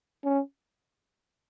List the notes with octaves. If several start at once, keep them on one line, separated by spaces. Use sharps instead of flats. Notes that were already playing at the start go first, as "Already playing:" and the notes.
C#4